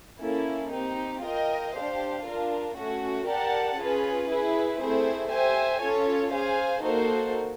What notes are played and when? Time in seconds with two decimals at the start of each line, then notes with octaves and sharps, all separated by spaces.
0.21 A#3 C#4 E4 A4
0.71 C4 D#4 G4
1.23 F4 A#4 D#5 G5
1.73 D4 G4 C5 F5
2.25 D4 F4 A#4
2.76 A3 C#4 F#4
3.26 G4 A#4 D5 F#5 A5
3.77 C#4 F4 G#4 B4
4.28 E4 G#4 B4
4.79 A3 C4 E4 G#4 C5
5.30 G4 C5 E5 G#5
5.81 C#4 F4 A4 C#5
6.32 G#4 C5 F5 G#5
6.83 A#3 D#4 F#4 A4 C5